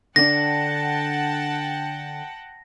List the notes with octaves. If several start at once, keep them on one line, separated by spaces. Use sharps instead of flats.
D3 D4 F#5 G5 A5 A#6